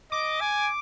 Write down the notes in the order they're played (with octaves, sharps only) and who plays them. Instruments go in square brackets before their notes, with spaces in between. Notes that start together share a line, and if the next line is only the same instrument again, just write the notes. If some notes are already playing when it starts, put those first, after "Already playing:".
[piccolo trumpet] D#5 [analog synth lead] D6
[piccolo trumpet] G#5